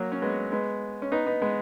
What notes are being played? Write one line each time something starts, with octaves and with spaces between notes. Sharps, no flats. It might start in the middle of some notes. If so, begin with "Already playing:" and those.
Already playing: F#3 A#3
C#4
G#3 B3
G#3 B3
C#4
B3 D#4
B3 D#4
G#3 B3